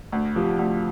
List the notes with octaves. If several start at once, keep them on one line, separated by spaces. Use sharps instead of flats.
D2
C3 F3
D2